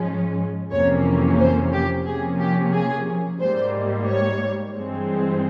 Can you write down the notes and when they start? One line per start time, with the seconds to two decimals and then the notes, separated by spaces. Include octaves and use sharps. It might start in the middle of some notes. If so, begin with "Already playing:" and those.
Already playing: G#2 F3 G#3 C#4
0.71 F2 C3 E3 A#3 C#4 C#5
1.39 C5
1.72 G4
2.06 C3 F3 A#3 C#4 G#4
2.40 G4
2.73 G#4
3.40 G#2 G3 A#3 C5
4.07 C#5
4.75 G2 E3 G#3 C4